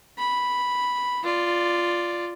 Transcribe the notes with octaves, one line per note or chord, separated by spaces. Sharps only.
B5
F4 D5